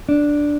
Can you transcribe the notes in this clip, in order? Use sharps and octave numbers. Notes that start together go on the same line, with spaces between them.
D4